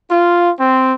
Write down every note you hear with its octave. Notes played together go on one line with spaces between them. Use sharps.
F4
C4